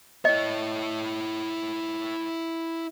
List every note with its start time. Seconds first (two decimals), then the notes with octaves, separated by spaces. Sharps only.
0.25 E4 C#5 D#5